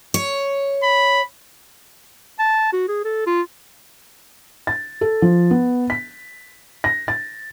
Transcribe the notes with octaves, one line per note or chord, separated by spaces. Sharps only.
C#5
B5
A5
F#4
G#4
A4
F4
A6
A4
F3
B3
B6
A#6
A6